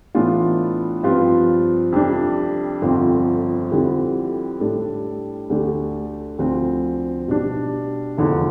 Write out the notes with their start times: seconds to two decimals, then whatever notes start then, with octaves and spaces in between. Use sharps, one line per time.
0.15 A2 E3 B3 D4 F4
1.03 G2 F3 C4 F4 B4
1.92 F2 C3 G3 D4
2.82 G1 F2 D3 F3 C4
3.71 F2 D3 G3 C4 E4
4.60 A2 G3 D4 A4
5.50 D2 D3 A3 D4 G4
6.39 D2 D3 F3 C4
7.28 B2 G3 D4
8.17 F1 E2 D3 F3